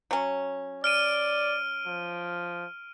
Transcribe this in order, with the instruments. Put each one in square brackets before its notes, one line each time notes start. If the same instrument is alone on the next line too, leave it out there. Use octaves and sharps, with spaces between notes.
[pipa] F#3 C#4
[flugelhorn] D5 [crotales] F6 D7 D#7
[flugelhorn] F3